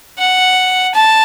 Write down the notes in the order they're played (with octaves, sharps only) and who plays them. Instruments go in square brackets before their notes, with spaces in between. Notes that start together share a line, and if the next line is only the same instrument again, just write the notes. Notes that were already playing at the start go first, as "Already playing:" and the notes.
[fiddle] F#5
A5